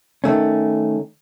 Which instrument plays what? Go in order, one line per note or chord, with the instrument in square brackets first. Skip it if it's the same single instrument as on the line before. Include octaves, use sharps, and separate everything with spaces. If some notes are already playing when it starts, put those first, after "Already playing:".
[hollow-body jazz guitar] D#3 A3 C#4